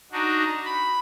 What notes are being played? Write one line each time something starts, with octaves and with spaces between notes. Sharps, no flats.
D4 D#4 F#4
B5